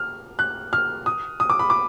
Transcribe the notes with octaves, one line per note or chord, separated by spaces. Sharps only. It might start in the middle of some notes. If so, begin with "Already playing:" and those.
Already playing: F6
F#6
F6
D#6
D#6
D6
B5
D6